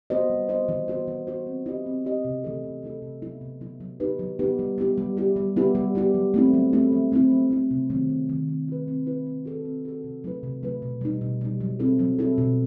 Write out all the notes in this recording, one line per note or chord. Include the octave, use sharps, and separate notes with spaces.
B3 F#4 C5 D#5
G3
B3 F#4 C5 D#5
E3
B3 F#4 C5
E3
B3 F#4 C5
C4
E4 G4 D#5
C4
E4 G4 D#5
C3
E3 A3 E4 A4
C3
E3 A3 E4 A4
C3
F#3 B3 E4
C3
F#3 B3 E4
F#3
B3 D#4 G4 B4
F#3
B3 D#4 G4 B4
G3
B3 E4 G4
G3
B3 E4 G4
G3
B3 E4 G4
G3
B3 E4 G4
F#3
A3 C4 E4
F#3
A3 C4 E4
F#3
A3 C4 E4
F#3
A3 C4 E4
C3
D#3 F#3 A3 C4
C3
D#3 F#3 A3 C4
C4
E4 B4
C4
E4 B4
C4
F#4 A4
C4
F#4 A4
C3
F#3 A3 E4 B4
C3
F#3 A3 E4 B4
B2
G3 D#4
B2
G3 D#4
F#3
C4 E4 A4
F#3
C4 E4 A4
B2